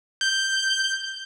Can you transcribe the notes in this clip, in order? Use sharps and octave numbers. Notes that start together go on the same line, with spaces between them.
G6